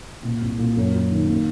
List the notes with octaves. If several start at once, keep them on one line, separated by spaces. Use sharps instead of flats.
A#2
C2
A#2
F#2
F#3
D#3
A#3